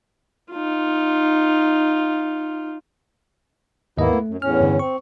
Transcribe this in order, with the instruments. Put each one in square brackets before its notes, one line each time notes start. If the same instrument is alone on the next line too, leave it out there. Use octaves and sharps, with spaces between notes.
[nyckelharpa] D#4 F4
[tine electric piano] D#2 G#2 D#5 [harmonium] A#3 B3 E4
[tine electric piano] A3
[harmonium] F#2
[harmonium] E2 A2 C#4 [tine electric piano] F6
[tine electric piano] G2 D3
[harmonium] C4 [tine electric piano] C#6